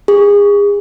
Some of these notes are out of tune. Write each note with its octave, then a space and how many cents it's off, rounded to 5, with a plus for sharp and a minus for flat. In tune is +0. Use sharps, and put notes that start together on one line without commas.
G#4 -30